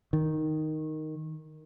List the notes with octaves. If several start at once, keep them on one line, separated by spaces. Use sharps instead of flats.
D#3